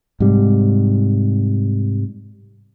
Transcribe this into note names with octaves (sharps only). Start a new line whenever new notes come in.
G#2 C3 G3